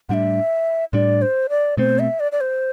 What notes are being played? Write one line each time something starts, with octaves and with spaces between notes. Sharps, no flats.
A2 G3 D4 E5 F#5
A2 G3 D4 D5
C5
D5
B2 A3 C4 C5
E5
D5
D5
C5